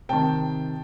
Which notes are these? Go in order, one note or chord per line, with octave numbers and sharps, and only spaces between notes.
C3 D#3 G5 A5